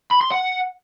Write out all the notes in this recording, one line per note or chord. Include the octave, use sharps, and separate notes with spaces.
B5
C6
F#5